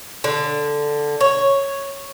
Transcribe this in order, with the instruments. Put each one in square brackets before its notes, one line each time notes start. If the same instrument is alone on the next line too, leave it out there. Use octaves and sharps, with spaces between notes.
[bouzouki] D3
C#5